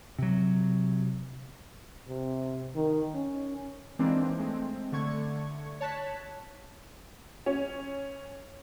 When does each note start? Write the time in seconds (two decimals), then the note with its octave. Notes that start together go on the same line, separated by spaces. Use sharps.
0.18 C3 F#3
2.08 C3
2.75 D#3
3.14 C#4
3.99 E3 G#3 A#3 C4 D4 D#4
4.38 G#3 A3 C4
4.92 D3 A3 C#6 G#6
5.80 C#5 A5 F#6 B6
7.46 C#4